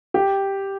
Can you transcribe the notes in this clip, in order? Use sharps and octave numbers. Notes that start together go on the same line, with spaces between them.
G4